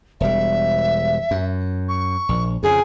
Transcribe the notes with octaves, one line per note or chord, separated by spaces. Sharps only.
E1 G3 E5
F#2
C#6
A#1
F2 C#3 G#4